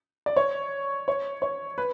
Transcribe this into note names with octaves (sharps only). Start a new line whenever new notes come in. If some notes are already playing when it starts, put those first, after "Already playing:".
D5
C#5
C#5
C#5
B4